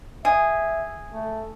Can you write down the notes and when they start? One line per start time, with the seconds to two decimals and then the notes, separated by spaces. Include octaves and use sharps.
0.25 G#4 E5
1.13 A3